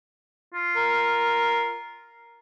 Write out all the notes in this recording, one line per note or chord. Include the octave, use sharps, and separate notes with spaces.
F4
A#4